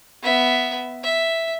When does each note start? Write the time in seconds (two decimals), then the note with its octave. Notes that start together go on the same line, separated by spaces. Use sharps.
0.22 B3 E5
1.04 E5